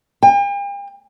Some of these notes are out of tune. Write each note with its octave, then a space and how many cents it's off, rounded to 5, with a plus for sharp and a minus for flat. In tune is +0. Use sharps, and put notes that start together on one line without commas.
G5 +45